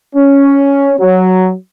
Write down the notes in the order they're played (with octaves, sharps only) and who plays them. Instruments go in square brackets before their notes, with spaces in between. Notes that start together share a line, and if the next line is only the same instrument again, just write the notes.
[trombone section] C#4
F#3